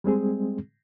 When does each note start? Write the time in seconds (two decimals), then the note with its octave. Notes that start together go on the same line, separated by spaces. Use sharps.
0.04 G3 G#3 C4 G#4